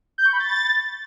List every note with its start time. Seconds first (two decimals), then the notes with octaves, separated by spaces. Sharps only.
0.18 G6
0.25 C#6
0.33 B5
0.40 A6